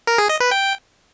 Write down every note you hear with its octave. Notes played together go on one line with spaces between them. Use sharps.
A#4
G#4
D#5
B4
G5